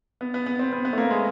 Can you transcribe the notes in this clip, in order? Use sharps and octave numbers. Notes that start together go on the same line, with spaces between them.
B3
B3
B3
C4
B3
B3
A3
A#3
G#3